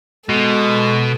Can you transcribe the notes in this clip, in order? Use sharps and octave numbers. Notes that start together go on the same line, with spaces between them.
B2 G#3 A4